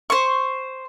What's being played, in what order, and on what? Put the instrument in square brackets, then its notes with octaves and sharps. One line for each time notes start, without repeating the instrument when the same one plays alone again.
[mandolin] C5 C#6